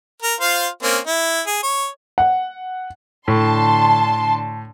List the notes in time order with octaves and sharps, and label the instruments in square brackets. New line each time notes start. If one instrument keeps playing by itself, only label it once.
[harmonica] A#4
F4 C5 F5
A#3 C4 C#4
E4
G#4
C#5
[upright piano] F#5
[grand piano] A2 [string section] D3 A5 C6